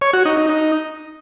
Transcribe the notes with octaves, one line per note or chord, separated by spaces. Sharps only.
C#5
F#4
D#4
D#4
D#4